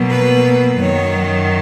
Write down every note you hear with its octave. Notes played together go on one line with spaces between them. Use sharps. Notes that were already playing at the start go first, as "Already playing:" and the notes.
Already playing: B2 F#3 A#3
B4
F#2 D#3 F#3 C#5